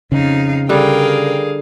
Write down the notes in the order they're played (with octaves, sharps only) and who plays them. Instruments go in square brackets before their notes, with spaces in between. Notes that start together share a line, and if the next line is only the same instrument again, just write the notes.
[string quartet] F2 D#4 F5 [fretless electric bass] C#3
[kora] D3 G3 [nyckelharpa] G#4 F5 [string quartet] A#4 G5